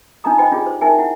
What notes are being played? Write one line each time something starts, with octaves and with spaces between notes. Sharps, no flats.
D4 D#4 F4 D#5 A#5 D#6
C5 D#5 G5 G#5 B5
D4 F4 G4 G#4 D5
C5
D#4 A#4 E5 G5 G#5
E4 F#5